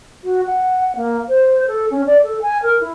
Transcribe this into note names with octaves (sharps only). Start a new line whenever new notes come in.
F#4
F#5
A#3
C5
A4
C#4
D5
A4
G#5
A#4
E4